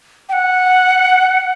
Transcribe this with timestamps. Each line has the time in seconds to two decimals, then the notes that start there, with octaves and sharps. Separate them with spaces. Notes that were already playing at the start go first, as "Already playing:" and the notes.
0.29 G5
0.33 F#5